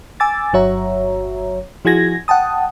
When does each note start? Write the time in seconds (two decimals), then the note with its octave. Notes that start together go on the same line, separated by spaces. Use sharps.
0.20 G#5 D6 E6 A6
0.53 G1 F#3 F#4 C#5 E5 A#5
1.85 F3 E4 F#4 G#4 G#6 A#6
2.28 F#5 G5 A5 D#6